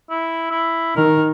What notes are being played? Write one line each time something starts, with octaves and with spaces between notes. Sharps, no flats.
E4
E4
D#3 A#4